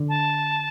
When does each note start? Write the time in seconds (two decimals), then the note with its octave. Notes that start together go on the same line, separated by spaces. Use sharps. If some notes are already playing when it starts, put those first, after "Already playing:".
Already playing: D3
0.09 A5